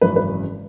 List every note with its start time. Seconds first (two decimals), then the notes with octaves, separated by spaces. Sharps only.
0.02 G#1 F#2 C#3 E3 B4
0.16 B4